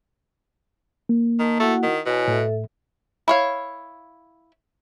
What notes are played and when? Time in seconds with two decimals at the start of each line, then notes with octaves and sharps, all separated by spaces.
1.09 A#3
1.39 D#3 A5 A#5
1.60 A3 E4 F#4 F#5
1.83 D#3
2.06 B2 E4 C#5 G#5
2.28 A2 A4 E5
3.28 E4 C#5 F5